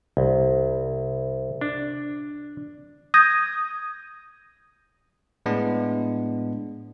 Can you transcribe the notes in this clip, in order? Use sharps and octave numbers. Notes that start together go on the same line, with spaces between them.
C2
D4
D#6 G6 G#6 A#6
A2 G#3 B3 D4